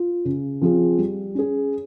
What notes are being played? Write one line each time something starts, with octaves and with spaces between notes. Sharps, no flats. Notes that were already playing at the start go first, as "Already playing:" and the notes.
Already playing: F4
C#3
F3 C4 F4 G#4
G3
C#4 G#4